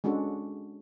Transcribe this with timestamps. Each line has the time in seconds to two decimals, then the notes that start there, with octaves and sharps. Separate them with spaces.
0.04 G#3 C#4 D4 F#4 A4